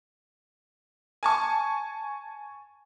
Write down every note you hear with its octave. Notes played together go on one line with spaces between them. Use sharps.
G#5 A5 C#6